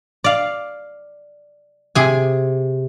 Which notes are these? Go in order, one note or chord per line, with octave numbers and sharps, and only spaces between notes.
D5 F5
C3 G#4 G#5